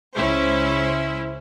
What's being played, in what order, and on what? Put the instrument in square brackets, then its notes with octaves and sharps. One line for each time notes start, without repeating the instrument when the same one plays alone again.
[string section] C#2 C#4 E4 C5 E5